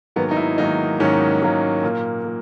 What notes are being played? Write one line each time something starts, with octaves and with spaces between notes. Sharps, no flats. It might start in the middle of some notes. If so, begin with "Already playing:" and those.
G#2 D#3 F#3 A#3 B3
D#4
E4
G#2 D#3 F#3 A#3 D#4
G#2 D#3 F#3 A#3 C#4
G#2 D#3 F#3 A#3
A#2 A#3
A#2